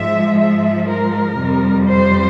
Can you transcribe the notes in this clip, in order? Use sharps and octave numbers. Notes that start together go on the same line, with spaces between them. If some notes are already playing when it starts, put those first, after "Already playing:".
Already playing: G#2 F3 G#3 E5
E5
A#4
F2 C3 G3
C5